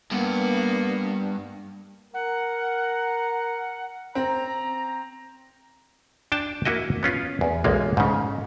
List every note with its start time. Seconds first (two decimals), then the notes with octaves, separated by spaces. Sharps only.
0.11 G2 A#3 B3
2.14 A#4 F#5
4.15 C4 A#5
6.32 D4 G5 A5
6.65 A#3 E4 F#4 D#5
7.03 B3 C#4 F4
7.41 E2
7.64 B1 E2 G#3 A#3
7.97 G#2 C#3